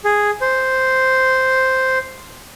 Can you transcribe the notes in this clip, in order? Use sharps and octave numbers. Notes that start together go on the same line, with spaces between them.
G#4
C5